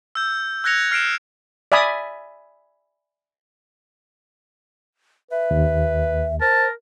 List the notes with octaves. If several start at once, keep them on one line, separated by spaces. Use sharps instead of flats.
E6 G6
E6 F#6 G#6 A#6 C#7 F7
F6 C7 D7 E7
D5 E5 G#5 B5 D#6
B4 E5
D#2
A#4 C5 A5